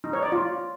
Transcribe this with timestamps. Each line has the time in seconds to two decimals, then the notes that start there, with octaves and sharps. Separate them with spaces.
0.04 D#4
0.13 C#5
0.23 D5
0.32 F4